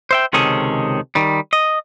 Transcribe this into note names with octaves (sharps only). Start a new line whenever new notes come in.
C5 E5 G5
C#2 C3 D#3 C#4 G#4 A4
D#3 G3
D#5